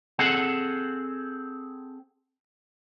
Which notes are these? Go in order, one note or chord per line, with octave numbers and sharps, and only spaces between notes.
C4 G#4 A4 F#5